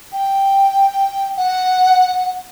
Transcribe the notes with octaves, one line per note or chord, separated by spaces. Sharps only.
G5
F#5